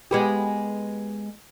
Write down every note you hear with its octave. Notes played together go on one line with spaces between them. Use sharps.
G#3 B3 G4